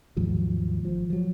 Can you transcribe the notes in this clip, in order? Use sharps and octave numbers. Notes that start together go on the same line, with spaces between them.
D#2 G#2 F3 F#3
G#1 F3
F3 F#3